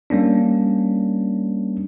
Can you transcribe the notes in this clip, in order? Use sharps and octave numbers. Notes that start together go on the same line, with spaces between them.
G3 A#3 C#4 D4